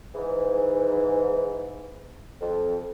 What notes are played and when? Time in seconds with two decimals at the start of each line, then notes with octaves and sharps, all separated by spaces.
0.15 G#2 E3
2.41 F2